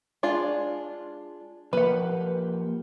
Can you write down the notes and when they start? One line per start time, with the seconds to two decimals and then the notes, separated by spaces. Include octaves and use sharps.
0.23 G#3 D4 F4
1.73 F3 A#3 G4 B4 F#5